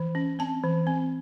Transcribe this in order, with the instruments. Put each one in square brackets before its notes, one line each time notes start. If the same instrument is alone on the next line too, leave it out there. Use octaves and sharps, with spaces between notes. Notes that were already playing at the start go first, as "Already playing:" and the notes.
Already playing: [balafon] E3
C#4
C4 A5
E3
C4